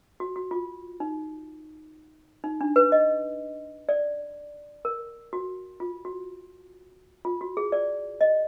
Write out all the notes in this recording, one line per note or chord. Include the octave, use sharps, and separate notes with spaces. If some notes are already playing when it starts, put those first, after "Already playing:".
F#4
F#4
F4
D#4
D#4
D4
B4
D#5
D5
A#4
F#4
F4
F#4
F4
F#4
G#4
D5
D#5